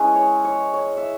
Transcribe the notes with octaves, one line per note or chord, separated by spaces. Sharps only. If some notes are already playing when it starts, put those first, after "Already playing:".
Already playing: G#3 C#4 E4 B4
C#5
C#5
C#5
E5